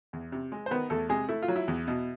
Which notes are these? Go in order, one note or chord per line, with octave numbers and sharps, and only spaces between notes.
E2
C3
G#3
C5
D#3 B3 B4
E2 A3 A4
C3 G#3 G#4
A3 E4
F4
F#3
E4
E2
B2